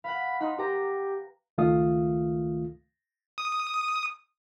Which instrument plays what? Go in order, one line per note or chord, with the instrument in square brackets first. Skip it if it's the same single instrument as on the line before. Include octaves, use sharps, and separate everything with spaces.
[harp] F5 F#5 [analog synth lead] B5
[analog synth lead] D#4 [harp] B5 C6 F#6
[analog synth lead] G4 [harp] B4 A#5
[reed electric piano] C#2 D#3 A3 F4 F5 D#6
[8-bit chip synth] D#6